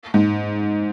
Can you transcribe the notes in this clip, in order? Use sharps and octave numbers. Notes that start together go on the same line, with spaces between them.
G#2